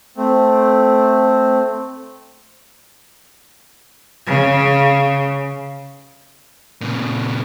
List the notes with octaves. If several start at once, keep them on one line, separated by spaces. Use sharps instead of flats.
A3 C4
C#3
A#2 C#3